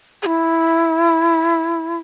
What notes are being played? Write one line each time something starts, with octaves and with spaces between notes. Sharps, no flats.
G#4
E4